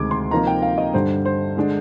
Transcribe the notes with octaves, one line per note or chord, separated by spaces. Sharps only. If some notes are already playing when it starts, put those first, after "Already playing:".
Already playing: D2 C3 D#3 G#3 D6 G#6
C6
C3 F3 A#3 D#4 A#5
G5
F5
D#5
G2 D3 G3 C5
C5
D3 G#3 D4